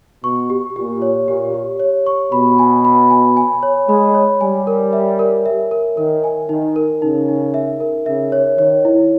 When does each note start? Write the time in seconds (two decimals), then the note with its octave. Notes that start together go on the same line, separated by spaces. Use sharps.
0.24 B2 C#6
0.50 G4
0.76 A#2 G4
1.02 C#5
1.28 A#2 G4
1.54 G4
1.80 C#5
2.07 C#6
2.32 B2 B5
2.59 G#5
2.85 B5
3.10 G#5
3.37 G#5
3.63 C#5
3.88 G#3 B5
4.14 C#5
4.41 G3 G#5
4.67 A#4
4.93 E5
5.19 A#4
5.46 E5
5.71 A#4
5.97 D#3 A#4
6.24 G#5
6.49 D#3 D#4
6.76 A#4
7.02 C#3 D#4
7.29 D#4
7.54 E5
7.80 A#4
8.06 C#3 E5
8.32 C#5
8.58 D#3 C#5
8.85 E4